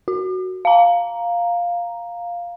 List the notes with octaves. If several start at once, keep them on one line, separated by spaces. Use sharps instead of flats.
F#4
F5 A#5